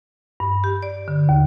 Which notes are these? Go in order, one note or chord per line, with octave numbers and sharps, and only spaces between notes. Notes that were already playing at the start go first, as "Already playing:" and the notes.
G2
G4
D5
D3
D#2